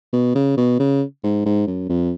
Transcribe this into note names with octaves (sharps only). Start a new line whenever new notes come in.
B2
C#3
B2
C#3
G#2
G#2
F#2
F2